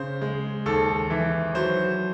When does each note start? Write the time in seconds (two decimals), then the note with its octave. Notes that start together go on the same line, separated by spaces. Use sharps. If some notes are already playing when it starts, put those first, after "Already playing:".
Already playing: C#3 C5
0.22 G#3
0.66 D#2 A4
1.10 E3
1.55 F#3 C5